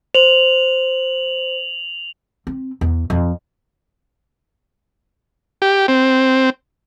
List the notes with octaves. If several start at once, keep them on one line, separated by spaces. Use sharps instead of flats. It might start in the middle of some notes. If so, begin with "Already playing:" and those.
C5 F7 F#7
C4
E2
F2
G4
C4